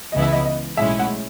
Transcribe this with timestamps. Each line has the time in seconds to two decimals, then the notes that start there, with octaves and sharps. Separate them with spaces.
0.12 C#2 C#3 E3 B3 E4 D#5
0.22 E5
0.32 D#5
0.45 D#5
0.77 B1 A2 G#3 C#4 E4 E5
0.99 F#5